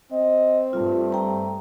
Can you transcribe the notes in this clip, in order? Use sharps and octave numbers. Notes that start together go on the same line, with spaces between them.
C4 D#5
G2 A3 F4
G5 A#5